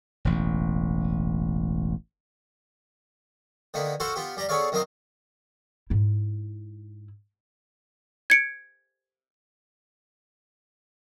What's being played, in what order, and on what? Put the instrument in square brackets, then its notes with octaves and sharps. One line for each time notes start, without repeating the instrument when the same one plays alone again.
[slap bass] E1 A1
[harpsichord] D3 D#3 A#3 B3
F#4 A4 C5 F5 F#5
B3 F4 G4
G3 G4 D5 A#5
B3 G#4 A4 C#5 D5 F5
F#2 D#3 C4 A#4 D#5 F5
[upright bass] G#2 E4
[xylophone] G#6 C#7 D7